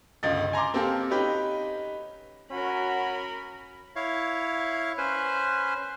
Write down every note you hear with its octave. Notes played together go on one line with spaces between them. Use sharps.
G1 C#2 D#5 A6
G#5 A#5 C6 D6
A#3 C4 G4 A4 F5
C#4 D#4 G4 B4
C#4 F#4 A#4 B5
E4 C#5 F5
C#4 B4 C5